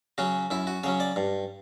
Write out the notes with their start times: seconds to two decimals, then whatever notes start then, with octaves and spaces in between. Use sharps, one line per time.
0.18 C#3 F#3 C#4 F#4
0.51 F#2 E4
0.67 F#4
0.84 C#3 F#3 C#4 C#5
1.00 D5
1.16 G2